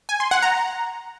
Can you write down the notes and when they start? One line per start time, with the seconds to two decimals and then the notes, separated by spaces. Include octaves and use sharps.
0.09 G#5
0.20 C6
0.31 F#5
0.42 A#5